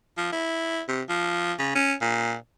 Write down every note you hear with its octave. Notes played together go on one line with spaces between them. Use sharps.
F3
E4
C3
F3
C#3
C#4
A#2